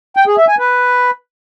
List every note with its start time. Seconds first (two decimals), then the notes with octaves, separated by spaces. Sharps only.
0.17 G5
0.27 G#4
0.38 E5
0.48 G#5
0.59 B4